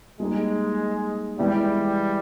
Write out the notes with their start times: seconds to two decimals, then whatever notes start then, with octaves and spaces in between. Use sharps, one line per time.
0.20 G3 G#3 A#3 D#4
1.38 E3 G3 G#3 B3 E4